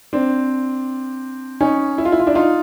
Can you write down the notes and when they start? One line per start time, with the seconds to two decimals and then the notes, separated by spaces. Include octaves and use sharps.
0.13 C4 D4
1.61 C#4 D#4
1.98 E4
2.05 F4
2.12 E4
2.20 F4
2.27 D4 E4
2.35 D#4 F4